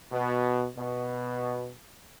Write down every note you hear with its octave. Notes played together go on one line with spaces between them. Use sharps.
B2
B2